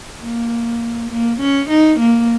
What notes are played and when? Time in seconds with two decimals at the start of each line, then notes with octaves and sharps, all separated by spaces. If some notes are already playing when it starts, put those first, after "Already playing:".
0.22 A#3
1.11 A#3
1.40 C#4
1.69 D#4
2.00 A#3